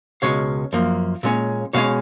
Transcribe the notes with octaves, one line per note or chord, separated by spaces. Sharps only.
C#2 B2 G#3 C#4 C#5 F5
F#2 F3 A#3
A#2 G#3 C#4
B2 G#3 C#4 C#5 F5